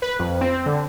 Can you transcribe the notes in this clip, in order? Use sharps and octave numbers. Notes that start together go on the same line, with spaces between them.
B4
F2
C4
D3